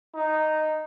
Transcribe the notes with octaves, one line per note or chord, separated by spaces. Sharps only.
D#4